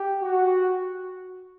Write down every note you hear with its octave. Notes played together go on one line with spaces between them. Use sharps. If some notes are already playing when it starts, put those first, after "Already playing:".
Already playing: G4
F#4